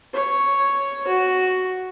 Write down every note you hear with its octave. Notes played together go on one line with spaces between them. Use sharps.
C#5
F#4